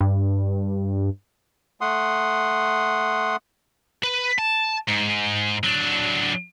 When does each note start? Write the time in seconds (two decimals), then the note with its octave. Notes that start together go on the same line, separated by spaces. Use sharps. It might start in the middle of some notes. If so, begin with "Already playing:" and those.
0.01 G2
1.81 A3 F#5 C6 D#6
4.03 B4
4.38 A5
4.88 G#2
5.64 F#3 D4